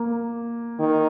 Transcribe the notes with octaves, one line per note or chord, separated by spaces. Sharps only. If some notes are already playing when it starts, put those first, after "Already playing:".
Already playing: A#3
D#3